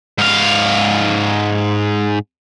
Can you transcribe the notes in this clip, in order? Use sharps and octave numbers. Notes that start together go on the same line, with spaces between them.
G#2 F5